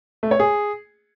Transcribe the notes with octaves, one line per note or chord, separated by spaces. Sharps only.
A3
C#5
G#4